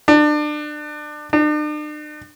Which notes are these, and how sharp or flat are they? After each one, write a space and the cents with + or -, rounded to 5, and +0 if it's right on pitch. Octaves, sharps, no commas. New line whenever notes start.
D4 +30
D4 +45